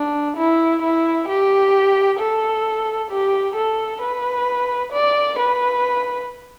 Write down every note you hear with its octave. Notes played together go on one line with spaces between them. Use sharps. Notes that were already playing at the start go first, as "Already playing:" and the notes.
Already playing: D4
E4
E4
G4
A4
G4
A4
B4
D5
B4